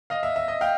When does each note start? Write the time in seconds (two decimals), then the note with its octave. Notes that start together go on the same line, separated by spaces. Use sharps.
0.10 D#5 F5
0.23 E5
0.36 E5
0.48 D#5
0.61 F5 G5